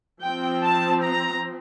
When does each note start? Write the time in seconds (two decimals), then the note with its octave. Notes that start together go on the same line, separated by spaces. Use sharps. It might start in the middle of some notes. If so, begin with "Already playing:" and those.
0.21 F3 C4 G5
0.63 A5
1.04 A#5